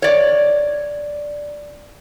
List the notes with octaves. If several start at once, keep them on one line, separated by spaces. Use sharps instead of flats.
C#5 D5